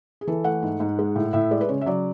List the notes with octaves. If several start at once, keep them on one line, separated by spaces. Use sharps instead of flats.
G#4
E3 A4
A3 F#5
G#2
G#2
G#3
A2
A2 E5
G#3 D5
B4
C#3 C#5
E5
F#3 D5